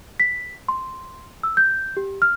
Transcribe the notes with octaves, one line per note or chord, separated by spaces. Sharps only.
B6
C6
E6
G6
G4
F6